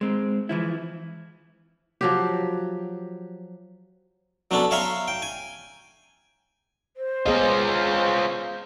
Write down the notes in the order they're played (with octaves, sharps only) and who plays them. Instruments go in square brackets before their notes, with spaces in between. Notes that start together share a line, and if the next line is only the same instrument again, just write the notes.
[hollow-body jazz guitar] G#3 C4
E3 F3 E4
[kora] F3 F#3 G4
[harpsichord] F#3 B3 C#4 D4 A4
C#5 E5 F5 A#5 C6 C#6
G5
G#5
[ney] C5
[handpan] B3 G#4 D#5 [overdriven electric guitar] C#4 F4